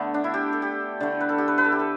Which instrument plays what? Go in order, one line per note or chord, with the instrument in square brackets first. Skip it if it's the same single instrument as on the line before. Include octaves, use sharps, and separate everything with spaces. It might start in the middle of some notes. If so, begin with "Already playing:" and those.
Already playing: [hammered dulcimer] D3 A3 B3
D4
E4
G4
A4
G4
D3 A3
B4
A4
G4
B4
B4
A4
G4
A4